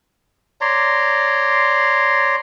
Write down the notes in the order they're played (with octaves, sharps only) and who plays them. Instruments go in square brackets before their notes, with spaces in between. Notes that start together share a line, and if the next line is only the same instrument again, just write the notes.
[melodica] C#5 D5 A#5 C6